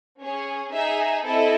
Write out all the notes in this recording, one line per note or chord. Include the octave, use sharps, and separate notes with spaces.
C#4 G#4 C#5
D#4 G#4 E5
C4 E4 A4 D#5